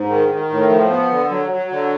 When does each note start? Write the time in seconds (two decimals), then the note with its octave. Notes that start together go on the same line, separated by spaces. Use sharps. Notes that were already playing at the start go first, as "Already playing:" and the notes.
Already playing: G#2
0.09 D#3
0.29 D#3
0.50 A2
0.69 F3
0.90 B3
1.10 D3
1.30 F#3
1.51 F#3
1.71 D3